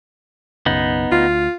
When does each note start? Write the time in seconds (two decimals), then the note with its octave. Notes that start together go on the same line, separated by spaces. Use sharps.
0.66 B1 F#2 C#3 B3 D#4
1.12 D2 F4